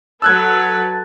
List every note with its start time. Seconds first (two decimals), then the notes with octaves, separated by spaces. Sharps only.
0.22 F#3 A4 B4 A5 E6 F#6 G#6